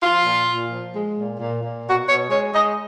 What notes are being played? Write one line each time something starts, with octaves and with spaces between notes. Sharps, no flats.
F3 F4
A#2
A#2
F3
G#3
A#2
A#2
A#2
B2 F#4
B2 C#5
G#3 C#5
G#3 D#5